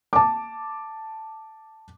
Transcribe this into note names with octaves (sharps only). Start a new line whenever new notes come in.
A5 D6